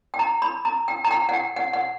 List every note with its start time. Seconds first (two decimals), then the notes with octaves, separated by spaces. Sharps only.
0.14 G5
0.19 A#5
0.42 B5
0.65 A#5
0.88 G5
1.05 A#5
1.11 G5
1.29 F#5
1.34 G5
1.56 F#5
1.73 F#5